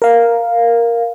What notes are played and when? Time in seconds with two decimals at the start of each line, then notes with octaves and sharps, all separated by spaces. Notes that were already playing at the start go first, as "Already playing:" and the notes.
0.02 A#4 F5